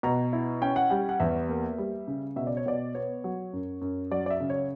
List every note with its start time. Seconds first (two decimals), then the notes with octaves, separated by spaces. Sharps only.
0.03 B2 A#5
0.33 E4
0.62 C#4 G5
0.76 F#5
0.90 G3 G5
1.09 F#5
1.20 E2 E5
1.49 A#3
1.78 G3
2.07 C#3
2.36 B2 E5
2.47 D5
2.57 C#5
2.66 B2 D5
2.94 B3 C#5
3.24 F#3
3.53 F#2
3.81 F#2
4.11 F#3 D5
4.26 D5
4.30 E5
4.40 C#3
4.50 C#5